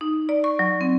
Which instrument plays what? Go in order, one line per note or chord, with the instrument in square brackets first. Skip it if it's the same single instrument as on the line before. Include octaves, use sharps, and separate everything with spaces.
[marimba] D#4
D5
C#6
F#3
C4